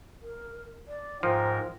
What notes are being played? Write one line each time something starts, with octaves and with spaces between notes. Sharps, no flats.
A#4
D5
G#2 F3 A#4 G5